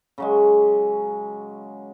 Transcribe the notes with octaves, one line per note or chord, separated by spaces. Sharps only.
C#3 F#3 G#3